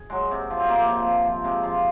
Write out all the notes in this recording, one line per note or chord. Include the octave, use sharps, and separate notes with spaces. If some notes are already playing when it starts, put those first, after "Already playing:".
Already playing: G#4
F#3 G#3
C3
F3
C4
C3 A#3
F3
C3
F3
C3 G#3
F3